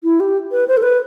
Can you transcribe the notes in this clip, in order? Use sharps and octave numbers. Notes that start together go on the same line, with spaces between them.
E4
G4
B4
C5
A4
B4